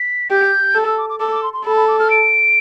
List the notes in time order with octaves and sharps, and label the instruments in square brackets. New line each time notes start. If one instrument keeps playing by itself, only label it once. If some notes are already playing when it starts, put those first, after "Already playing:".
Already playing: [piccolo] B6
[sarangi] G4 [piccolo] G6
[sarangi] A4
[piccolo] E6
D6
D6
[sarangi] A4 [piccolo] D6
[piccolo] D6
C6
C6
[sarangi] A4 [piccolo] B5
[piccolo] B5
D6
F6
D7